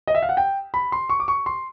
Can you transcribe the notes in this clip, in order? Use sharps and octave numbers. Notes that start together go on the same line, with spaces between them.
D#5
E5
F5
F#5
G5
B5
C6
C#6
D6
C#6
C6